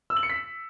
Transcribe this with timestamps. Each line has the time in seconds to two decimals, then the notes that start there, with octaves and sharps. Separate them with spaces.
0.10 E6
0.17 F#7
0.23 C#7
0.30 B6